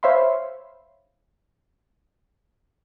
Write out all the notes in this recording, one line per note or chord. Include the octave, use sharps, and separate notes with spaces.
C5 C#5 E5 F5 B5 C6